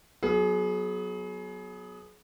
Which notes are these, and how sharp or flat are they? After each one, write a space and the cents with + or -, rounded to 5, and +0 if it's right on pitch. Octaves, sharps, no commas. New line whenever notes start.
F#3 +0 B3 -5 G#4 +30